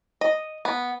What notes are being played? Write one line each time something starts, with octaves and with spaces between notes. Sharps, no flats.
D#5
B3